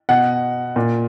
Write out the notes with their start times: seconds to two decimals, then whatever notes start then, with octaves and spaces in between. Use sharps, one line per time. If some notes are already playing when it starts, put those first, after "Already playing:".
0.09 B2 F#5
0.76 A#2